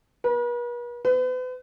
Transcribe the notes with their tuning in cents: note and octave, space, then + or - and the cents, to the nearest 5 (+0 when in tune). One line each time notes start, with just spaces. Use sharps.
B4 -45
B4 +40